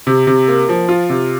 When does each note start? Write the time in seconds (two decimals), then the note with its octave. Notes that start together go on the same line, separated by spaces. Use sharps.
0.07 C3
0.27 C3
0.48 A#3
0.69 F3
0.89 F4
1.09 C3